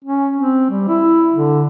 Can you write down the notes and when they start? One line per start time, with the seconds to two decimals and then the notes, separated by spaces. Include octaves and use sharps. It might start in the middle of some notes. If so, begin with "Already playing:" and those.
0.04 C#4
0.36 C4
0.70 G3
0.88 E4
1.32 D3